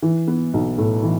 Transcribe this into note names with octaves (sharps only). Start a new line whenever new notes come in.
E3
B3
B1
A2
E3